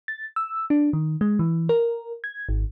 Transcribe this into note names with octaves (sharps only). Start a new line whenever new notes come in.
A6
E6
D4
D#3
G#3
E3
A#4
G#6
G#1